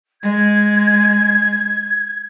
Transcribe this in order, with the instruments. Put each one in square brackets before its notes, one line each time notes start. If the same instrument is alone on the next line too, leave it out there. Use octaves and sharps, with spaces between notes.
[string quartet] G#3 [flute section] G#6